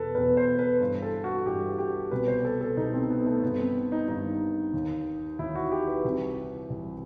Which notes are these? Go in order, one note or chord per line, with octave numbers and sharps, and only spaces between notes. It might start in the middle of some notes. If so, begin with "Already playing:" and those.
Already playing: E2 B2 A4 B4
E2 B2 B4
C5
B4
G2 E3
A4
F#4
G2 E3 G4
G4
C2 B2 B4
C5
A4
A4
C2 B2 D#4
C4
B3
A3
G2 D#3 B3
C4
D#4
G2 D#3 D#4
D#2 D#3
D#2 D#3 E4
F#4
G4
B4
C2 C3 E3
C2 C3 E3